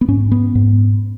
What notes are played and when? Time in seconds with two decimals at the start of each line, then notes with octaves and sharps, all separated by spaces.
0.01 B3
0.08 G#2 C#4
0.32 B3
0.55 G#2